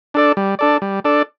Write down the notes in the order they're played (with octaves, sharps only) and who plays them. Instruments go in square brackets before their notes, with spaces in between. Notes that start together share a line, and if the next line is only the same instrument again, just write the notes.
[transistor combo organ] D4 A4 D5
G3
D4 A4 D5
G3
D4 A4 D5